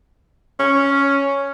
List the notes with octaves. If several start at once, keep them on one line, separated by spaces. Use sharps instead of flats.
C#4